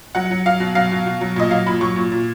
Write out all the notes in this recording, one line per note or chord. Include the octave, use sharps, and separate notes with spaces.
F#3 F#5
F#3
F#3 F5
B2
F#3 F5
B2
B2
F#3
A#2 D#5
F#3 F5
A#2 B5
F#3 C#6
A#2
A#2